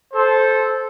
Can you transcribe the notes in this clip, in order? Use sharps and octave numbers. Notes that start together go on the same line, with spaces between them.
A4 C5